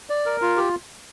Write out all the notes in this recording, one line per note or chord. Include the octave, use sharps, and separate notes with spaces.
D5
A#4
F4
G4